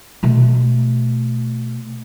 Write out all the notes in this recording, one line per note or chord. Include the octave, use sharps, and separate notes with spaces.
B2 A3